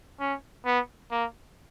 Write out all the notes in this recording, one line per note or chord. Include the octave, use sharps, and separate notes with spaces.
C#4
B3
A#3